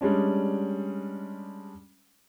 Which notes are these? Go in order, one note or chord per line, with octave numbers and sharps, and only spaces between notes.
G3 G#3 C#4 D4